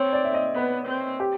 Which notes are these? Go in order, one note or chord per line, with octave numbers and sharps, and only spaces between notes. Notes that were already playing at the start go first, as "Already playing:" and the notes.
Already playing: C4 C#5
D5
E5
D#5
B3 B4
C4
G4